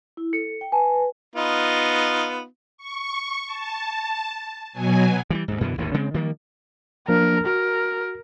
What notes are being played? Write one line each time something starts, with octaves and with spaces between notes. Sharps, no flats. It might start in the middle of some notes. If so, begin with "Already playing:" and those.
E4
A4 C#7
G5
B4 G#5 A5
B3 D#4 F4
C#6
A5
B2 F#3 G#5
E3 F#3 G3
D2 G#2
F#2 B2 D3 E3
G#1 D#2 A2 D3
C#3 G#3 C4
D#3 F3 G3 A#3
F3 A#3 D4 A#4
F#4 A#4